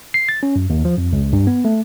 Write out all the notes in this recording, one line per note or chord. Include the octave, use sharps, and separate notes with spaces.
C7
A6
C#4
F#2
D#2
F3
F2
C#2
G2
B3
A3